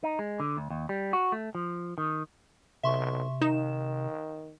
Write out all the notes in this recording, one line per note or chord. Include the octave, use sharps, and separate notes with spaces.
D#4
G#3
D3
D2
D#2
G3
F#4
A3
F3
D#3
B1 C3 E5 C6 C#6
D#3 D#4 E7